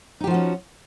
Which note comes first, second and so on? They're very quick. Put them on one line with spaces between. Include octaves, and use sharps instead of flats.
D#4 G4 F3 F#4 C#4